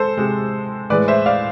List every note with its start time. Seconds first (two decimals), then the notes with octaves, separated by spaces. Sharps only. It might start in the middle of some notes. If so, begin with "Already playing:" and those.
Already playing: G#3 A4 C5
0.17 C3 G#3
0.90 A2 E3 G#3 B4 D5
1.08 C5 E5
1.26 D5 F5